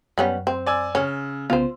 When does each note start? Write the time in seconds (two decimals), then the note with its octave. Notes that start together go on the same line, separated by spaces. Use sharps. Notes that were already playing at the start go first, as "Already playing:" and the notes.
0.18 F#2 G3 B3 C#4
0.47 C4
0.66 D5 G#5 E6
0.95 C#3 C#4
1.50 C2 C#3 B3 F4 C5